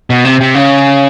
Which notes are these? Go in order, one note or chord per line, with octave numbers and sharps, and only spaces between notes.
B2
C3
C3
C#3